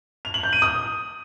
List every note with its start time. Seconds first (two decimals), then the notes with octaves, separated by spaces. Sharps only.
0.25 F7
0.34 F#7
0.43 G6
0.53 D#7
0.62 D#6